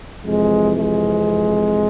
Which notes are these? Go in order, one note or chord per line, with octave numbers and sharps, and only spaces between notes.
F2 C3 E3 G#3
G#3